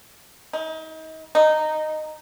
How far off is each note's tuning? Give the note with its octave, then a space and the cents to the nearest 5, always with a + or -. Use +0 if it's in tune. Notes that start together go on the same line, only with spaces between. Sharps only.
D#4 +35
D#4 -10